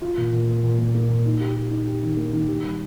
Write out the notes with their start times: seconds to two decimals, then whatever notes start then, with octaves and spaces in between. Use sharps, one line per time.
0.02 F4
0.17 A#2
0.33 A#2
0.48 A#2
0.64 A#2
0.79 A#2
0.94 A#3
1.09 A#2
1.25 D#4
1.40 G4
1.56 G4
1.71 D#4
1.86 G4
2.02 D#3
2.17 A#3
2.33 D#3
2.48 G4
2.63 G3